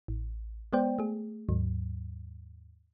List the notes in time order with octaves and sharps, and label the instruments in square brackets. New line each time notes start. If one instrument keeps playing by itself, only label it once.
[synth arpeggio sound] A1
G#3 B3 C5 D5 G5
A3 G#4
D#2 G#2 F#3